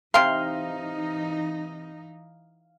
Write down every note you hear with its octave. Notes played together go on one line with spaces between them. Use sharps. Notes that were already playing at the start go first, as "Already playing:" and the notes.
C3 E3 D#4 F5 C6